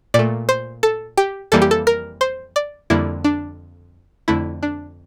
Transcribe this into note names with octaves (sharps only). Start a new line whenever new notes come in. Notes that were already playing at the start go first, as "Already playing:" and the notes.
A#2 A3 D5
C5
A4
G4
F2 E3 G3 A#3 A4
G4
A4
A#4
C5
D5
F2 D3 G3 A#3 E4
D4
F2 D3 A3 E4
D4